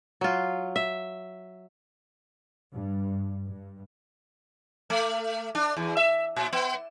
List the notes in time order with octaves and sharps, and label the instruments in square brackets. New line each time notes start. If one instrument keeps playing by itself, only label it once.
[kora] F#3 F4
E5
[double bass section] G2
G2
[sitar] A3
D4
E2
E5
A#2
B3